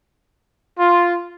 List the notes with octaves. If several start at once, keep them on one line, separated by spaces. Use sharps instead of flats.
F4